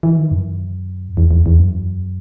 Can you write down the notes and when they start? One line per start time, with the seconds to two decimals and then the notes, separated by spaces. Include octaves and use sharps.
0.03 E3
0.17 D#3
0.32 F#2
1.17 E2
1.31 E2
1.46 E2
1.59 F#2